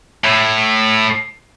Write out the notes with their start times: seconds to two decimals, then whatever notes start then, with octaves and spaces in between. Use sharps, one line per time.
0.24 A2